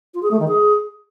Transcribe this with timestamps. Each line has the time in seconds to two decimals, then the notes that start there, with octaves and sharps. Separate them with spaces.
0.14 F4
0.23 G#4
0.31 A3
0.39 D#3
0.48 G#4